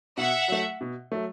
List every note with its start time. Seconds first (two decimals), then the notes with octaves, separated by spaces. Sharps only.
0.17 B2 E5 F#5
0.48 F#3 A3
0.81 B2
1.12 F#3 A3